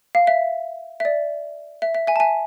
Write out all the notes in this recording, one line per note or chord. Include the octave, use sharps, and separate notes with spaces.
F5
E5
E5
D5
E5
E5
E5 G#5
A5
E5 G#5